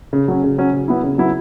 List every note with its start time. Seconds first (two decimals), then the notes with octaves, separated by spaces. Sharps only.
0.13 C#3
0.28 F#3 C#4
0.44 C#3
0.58 F#3 C#4
0.73 C#3
0.88 F#3 B3 E4
1.03 C#3
1.18 F#3 B3 E4